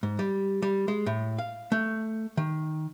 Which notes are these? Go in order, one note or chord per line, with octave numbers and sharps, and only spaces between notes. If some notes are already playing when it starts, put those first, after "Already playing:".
G#2
G3
G3
G#3
A2
F5
A3
D#3